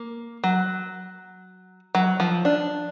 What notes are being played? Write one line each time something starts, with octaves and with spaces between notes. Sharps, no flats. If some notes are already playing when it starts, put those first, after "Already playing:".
Already playing: A#3
F#3
F#3
F3
D4